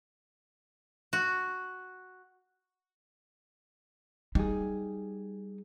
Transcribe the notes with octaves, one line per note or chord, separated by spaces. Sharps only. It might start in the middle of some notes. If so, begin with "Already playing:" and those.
F#4
G3 D#4 G#4